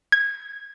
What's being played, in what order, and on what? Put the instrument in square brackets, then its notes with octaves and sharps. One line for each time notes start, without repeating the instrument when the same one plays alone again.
[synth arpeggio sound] G#6